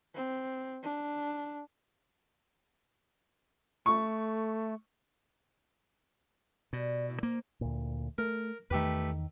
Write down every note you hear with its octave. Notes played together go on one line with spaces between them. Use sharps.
C4
D4
A3 C#6
B2 G3
A#2 D#3 E3
F3 A#3
D2 A#2
A3 A#4
E2 D#3 A3 G4 B4